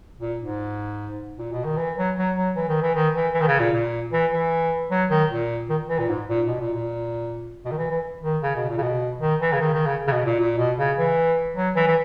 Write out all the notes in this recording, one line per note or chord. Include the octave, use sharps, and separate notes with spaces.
A#2
G#2
A#2
B2
D#3
E3
F#3
F#3
F#3
E3
D#3
E3
D#3
E3
E3
D#3
C#3
A#2
A#2
E3
E3
F#3
D#3
A#2
D#3
E3
A#2
G#2
A#2
B2
A#2
A#2
B2
D#3
E3
E3
D#3
C#3
B2
A#2
C#3
B2
D#3
E3
C#3
D#3
D#3
C#3
C#3
B2
A#2
A#2
B2
C#3
E3
F#3
E3
E3